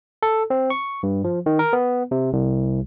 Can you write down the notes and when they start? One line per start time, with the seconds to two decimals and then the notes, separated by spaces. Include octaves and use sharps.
0.23 A4
0.50 C4
0.70 C#6
1.03 G2
1.24 F3
1.46 D#3
1.59 A#4
1.73 B3
2.11 C3
2.33 C2